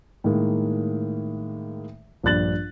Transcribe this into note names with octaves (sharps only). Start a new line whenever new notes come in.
A2 D#3 G#3 A#3
A#1 G2 D5 F#6 A6 F#7